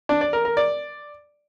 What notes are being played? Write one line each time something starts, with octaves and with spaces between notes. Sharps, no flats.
D4
D5
A#4
A#4
D5